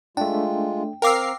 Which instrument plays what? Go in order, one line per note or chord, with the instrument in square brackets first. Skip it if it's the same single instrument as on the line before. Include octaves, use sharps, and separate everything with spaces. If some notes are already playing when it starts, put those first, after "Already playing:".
[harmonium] G#3 F4 [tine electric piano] A3 D4 [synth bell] G5
[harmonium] C4 [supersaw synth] A#4 F5 C7 [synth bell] G5 D6 E6